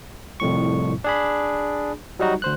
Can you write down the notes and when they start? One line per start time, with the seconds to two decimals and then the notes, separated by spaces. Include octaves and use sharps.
0.40 C2 F2 A2 C#6
1.04 D4 G#4 B5
2.19 F#3 G3 D#4 F#4
2.42 D2 C5 F#6